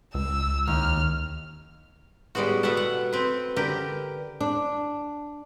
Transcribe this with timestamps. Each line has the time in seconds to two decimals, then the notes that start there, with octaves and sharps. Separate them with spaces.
0.14 C#2 E6
0.68 D#2 F6
2.35 A2 G3 G#3 B3 F#4
2.63 B2 A3 B3 E5 F#5 A5
2.77 F#5
3.13 C4 B4
3.56 D3 G4 A#4 B4
4.41 D4